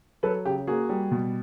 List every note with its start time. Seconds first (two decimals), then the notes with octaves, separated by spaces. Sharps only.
0.23 F#3 A4 B4
0.45 C#3 G4
0.67 A#3 F#4 G#4
0.89 G3
1.11 B2